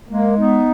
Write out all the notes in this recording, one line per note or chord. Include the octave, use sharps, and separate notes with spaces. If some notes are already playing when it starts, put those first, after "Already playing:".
G#3 A#3
B3 D#4